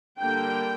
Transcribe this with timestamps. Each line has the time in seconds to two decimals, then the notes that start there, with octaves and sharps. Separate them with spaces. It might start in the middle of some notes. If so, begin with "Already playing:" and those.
0.20 D3 G3 A#3 G5